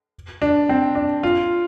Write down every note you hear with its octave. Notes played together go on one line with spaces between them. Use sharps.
D4
C4
D4
F4